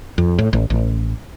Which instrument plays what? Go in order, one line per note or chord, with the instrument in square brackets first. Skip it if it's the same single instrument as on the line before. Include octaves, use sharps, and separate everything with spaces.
[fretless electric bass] F2
A2
A1
A1